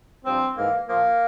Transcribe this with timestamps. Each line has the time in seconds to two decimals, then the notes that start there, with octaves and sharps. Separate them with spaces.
0.24 G2 F3 C4
0.56 G#2 E3 A#3
0.88 A#2 F3 A#3